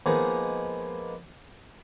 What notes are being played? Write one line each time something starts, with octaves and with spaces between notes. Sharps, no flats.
F3 G#3 A#3 B3 D#4